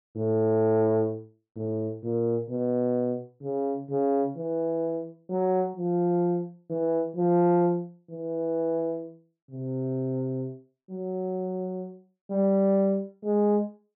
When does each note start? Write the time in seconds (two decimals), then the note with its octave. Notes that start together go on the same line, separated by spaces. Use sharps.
0.16 A2
1.56 A2
2.03 A#2
2.49 B2
3.42 C#3
3.90 C#3
4.36 E3
5.30 F#3
5.76 F3
6.70 E3
7.16 F3
8.10 E3
9.51 C3
10.91 F#3
12.31 G3
13.24 G#3